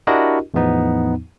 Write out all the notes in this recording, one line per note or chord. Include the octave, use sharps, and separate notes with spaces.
D4 E4 F#4 G4 A#4 D#5
E2 A2 F3 B3 D#4